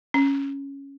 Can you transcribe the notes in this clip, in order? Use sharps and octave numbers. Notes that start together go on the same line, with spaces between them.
C#4